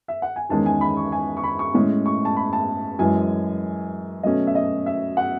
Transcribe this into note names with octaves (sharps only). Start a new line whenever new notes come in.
E5
F#5
G#5
E2 D#3 G#3 C#4 A5
G#5
B5
C#6
G#5
C#6
B5
C#6
A2 G#3 C#4
C#6
A5
B5
A5
F#2 E3 G#3 G#5
B2 F#3 A3 C#4 D#5
E5
D#5
E5
F#5